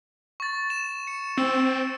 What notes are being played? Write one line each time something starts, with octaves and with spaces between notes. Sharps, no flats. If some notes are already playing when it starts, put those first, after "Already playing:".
C#6 A6
E7
C#7
C4 E6